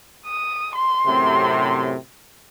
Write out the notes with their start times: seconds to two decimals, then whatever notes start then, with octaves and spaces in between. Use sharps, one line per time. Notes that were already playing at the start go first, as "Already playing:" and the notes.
0.26 D#6
0.75 C6
1.07 F#2 A2 C3